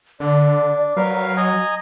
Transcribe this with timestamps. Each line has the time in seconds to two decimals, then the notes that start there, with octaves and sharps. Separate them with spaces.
0.20 D3 D4 D5
0.96 F#3 A#4 B4 F5
1.37 D#5 G#5 A#5